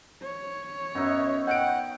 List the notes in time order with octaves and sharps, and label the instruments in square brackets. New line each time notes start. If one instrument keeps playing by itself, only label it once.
[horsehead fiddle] C#5
[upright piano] F#2 [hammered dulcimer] B3 D#4 E4
[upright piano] D#5 D7 [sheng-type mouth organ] F#5 [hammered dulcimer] G5